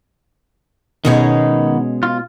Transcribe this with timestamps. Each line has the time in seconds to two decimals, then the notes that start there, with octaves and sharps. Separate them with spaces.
1.05 B2 D#3 G#3 B3 C#4 D#4
2.03 F4